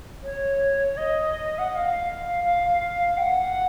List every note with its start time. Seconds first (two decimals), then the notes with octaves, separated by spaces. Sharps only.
0.23 C#5
0.97 D#5
1.58 F#5
1.71 F#5
1.75 F5
2.44 F5
3.18 G5
3.22 F#5